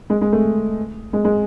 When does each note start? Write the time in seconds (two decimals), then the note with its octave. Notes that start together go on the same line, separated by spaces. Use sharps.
0.10 G#3
0.21 G#3
0.33 A3
1.13 G#3
1.25 G#3